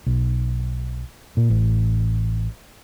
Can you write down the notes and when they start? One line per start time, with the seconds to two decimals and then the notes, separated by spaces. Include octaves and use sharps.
0.06 B1
1.37 A#2
1.50 A1